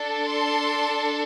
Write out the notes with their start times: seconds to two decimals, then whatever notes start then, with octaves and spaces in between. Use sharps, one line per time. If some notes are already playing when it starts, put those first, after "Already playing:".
Already playing: D4 A4
0.26 C6